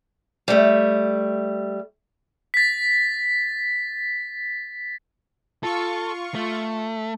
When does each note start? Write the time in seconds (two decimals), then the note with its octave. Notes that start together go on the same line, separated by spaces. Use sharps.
0.48 G3 A3
2.54 A6 B6
5.63 F4 A4 C#6
6.35 A3